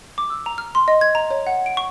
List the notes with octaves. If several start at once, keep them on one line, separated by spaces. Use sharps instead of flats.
D6
E6
A#5
F6
C6
D#5
G#6
A#5
C#5
F#5
D7
C#6